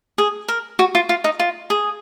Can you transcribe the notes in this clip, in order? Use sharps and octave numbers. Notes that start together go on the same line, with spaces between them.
G#4
A#4
F#4
F4
F4
D#4
F4
G#4